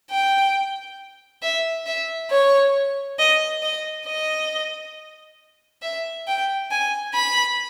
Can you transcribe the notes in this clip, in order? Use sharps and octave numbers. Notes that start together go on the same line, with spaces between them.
G5
E5
E5
C#5
D#5
D#5
D#5
E5
G5
G#5
B5